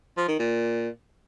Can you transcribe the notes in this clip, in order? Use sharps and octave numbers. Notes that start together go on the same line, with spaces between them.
F3
D#3
A#2